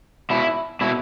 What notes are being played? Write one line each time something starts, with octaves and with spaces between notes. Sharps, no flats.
B2 E4
B2 E4